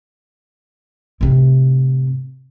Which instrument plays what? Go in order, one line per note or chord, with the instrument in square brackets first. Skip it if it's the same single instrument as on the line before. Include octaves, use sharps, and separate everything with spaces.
[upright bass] A2 C3